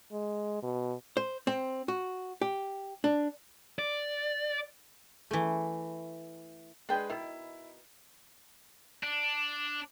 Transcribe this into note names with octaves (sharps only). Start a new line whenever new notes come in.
G#3
B2
C5
C4
F#4
G4
D4
D5
E3 A3
G#3 D4 G#4 B4 G5
B2 D#3 E4
D4